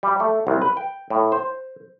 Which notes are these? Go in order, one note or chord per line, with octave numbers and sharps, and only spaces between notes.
G3
A3
C2
B4
G5
A2
C5